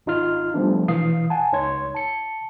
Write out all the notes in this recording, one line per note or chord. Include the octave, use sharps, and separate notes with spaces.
G#1 D#4 F4 F6
F3 G3 A3 B3 D4
B2 E3 F5 D#6 C7
F#5 G#5 A5
C#2 D#4 C#5 C6 G#6
A5 C#7